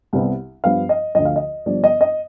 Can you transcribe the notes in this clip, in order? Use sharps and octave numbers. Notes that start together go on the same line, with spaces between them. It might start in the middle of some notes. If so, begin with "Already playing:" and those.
C2 C3 G3 B3
G2 F3 B3 F5
D#5
D2 D3 F3 D#5
F5
D#5
G1 G2 F3 D5
D#5
D#5